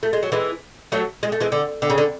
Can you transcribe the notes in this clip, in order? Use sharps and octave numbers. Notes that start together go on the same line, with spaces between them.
A3
G#3
F#3
E3 G#3
F#3 A3
G#3
A3
E3 G#3
D3
D3
C#3
D3